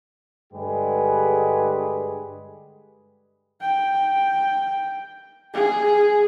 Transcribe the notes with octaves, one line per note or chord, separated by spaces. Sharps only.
G2 D3 G#3 G4 G#4 B4
G5
G#4